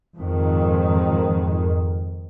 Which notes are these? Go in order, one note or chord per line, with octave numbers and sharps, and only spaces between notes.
F2 G#2 D#3